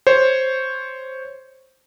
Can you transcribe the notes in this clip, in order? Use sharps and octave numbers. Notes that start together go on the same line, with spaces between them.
C5 C#5